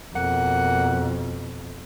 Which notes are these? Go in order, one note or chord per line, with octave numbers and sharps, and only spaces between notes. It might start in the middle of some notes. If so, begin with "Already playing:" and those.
F2 B2 A#3 F#5